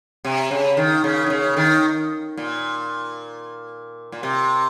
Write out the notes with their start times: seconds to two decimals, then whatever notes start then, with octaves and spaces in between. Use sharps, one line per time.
0.25 C3
0.51 C#3
0.77 D#3
1.04 C#3
1.26 D#3
1.30 C#3
1.57 D#3
2.37 A#2
4.12 A#2
4.23 C3